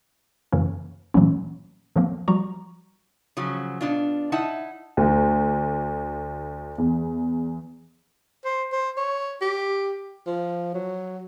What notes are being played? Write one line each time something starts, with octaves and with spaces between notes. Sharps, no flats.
F#2 C#3 E3 A#3 C#4
A#2 E3 F#3 A3 A#3 C#4
D#3 F3 F#3 A#3 C4
F3 G3 F#4 D5 A#5 C#6
C#3 F3 F#3
B2 D4 F4
D#4 E4 F#5 A5
D2
E2
C5
C5
C#5
G4
F3
F#3